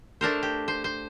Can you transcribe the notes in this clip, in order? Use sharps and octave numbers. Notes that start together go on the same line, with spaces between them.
A3 D4 A#4 C5
G4
C5
C5